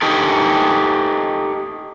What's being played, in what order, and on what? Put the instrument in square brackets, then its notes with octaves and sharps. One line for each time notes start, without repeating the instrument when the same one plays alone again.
[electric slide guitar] D#4 G4 A4